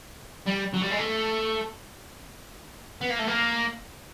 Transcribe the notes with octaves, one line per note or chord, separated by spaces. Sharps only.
G3
F#3
G3
G#3
A3
B3
A#3
A3
A#3